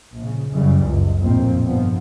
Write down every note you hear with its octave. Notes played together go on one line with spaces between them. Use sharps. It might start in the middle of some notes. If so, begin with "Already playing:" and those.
A#1 C#3
F#2 C#3 E3 G3
F#1 C#2
A#1 F2 A2 A#3 C4
G1 D3 F3 B3